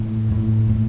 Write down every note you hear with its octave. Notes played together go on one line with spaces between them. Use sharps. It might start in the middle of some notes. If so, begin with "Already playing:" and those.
Already playing: A2
A2
A2